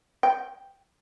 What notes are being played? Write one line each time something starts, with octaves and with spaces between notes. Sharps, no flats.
G5